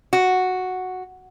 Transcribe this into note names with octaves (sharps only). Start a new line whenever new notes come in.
F#4